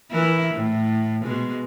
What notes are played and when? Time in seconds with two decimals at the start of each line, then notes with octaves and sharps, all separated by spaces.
0.11 E3 E4 A#4
0.54 A2
1.22 B2 G#3